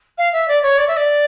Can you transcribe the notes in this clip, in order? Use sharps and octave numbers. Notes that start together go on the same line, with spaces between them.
F5
E5
D5
C#5
D5
E5
D5